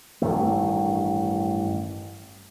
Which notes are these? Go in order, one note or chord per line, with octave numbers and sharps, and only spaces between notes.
A1 G2 D#3 A3